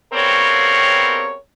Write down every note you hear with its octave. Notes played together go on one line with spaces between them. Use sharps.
C#3 G3 B3 C4 A#4 C#5